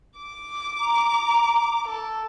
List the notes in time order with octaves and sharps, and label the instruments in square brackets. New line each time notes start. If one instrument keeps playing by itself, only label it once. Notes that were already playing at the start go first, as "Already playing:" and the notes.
[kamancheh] D6
[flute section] A#5
[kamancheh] A4